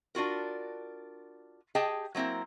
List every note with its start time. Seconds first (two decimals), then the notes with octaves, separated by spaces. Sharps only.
0.15 D4 F4 F#4 A#4
1.75 G4 G#4 D#5 G5 A5
2.15 F#3 A#3 C4 E4 A#4